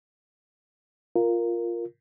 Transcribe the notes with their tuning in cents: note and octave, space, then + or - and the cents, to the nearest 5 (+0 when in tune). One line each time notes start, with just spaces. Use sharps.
F4 +0 A#4 +0